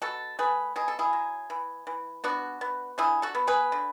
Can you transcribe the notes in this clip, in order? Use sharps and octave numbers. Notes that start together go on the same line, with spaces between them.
B2 F#4 A4
A3 G#4 B4
B2 G#4
A4
E4 G#4
F#3
E3
E3
B3 D4 F#4
B3
D3 E4 G#4
F#4 A4
B3
G#4 B4
D3